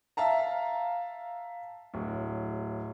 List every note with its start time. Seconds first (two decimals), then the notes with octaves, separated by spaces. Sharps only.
0.17 E5 F5 A5 A#5
1.94 D1